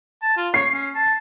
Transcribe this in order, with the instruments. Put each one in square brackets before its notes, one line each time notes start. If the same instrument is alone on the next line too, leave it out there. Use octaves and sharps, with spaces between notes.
[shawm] A5
F4
[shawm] C#5 [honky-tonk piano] C7
[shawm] C#4
A5